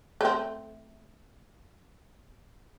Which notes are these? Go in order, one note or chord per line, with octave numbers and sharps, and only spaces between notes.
A3 C4